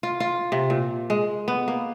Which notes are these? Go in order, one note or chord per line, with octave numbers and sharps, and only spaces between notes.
F4
F4
C3
A#2
G#3
B3
A#3